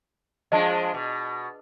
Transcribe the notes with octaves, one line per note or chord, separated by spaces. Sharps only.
F3 G#3 D4 D#5 A5
B2